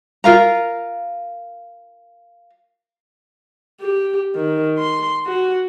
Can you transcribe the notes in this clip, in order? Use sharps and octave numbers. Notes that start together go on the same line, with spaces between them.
F4 A#4 F5 A#5
G4
D#3
C6
F#4